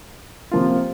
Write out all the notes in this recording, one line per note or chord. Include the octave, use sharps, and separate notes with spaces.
C3 F3 A#3 F4